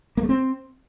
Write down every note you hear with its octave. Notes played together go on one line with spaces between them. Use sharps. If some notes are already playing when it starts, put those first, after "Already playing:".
A#3
A3
C4